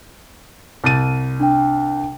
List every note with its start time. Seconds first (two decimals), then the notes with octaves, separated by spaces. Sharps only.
0.84 C2 A6 D#7
1.40 D4 G5